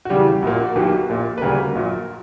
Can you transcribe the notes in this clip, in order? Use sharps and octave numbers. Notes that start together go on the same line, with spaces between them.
F#4
E2 C#3 G3 G4
A#1 A#2 A#3 F#4
F#4
B1 B2 F#3 A#3 G4
A#1 A#2 A#3
B4
D2 C#3 G3 A#3 F#4 A#4
A#1 A#2 F#3